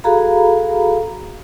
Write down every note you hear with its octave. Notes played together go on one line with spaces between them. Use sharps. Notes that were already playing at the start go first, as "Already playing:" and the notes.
F#4 G#4 A4 F5 A#5 B5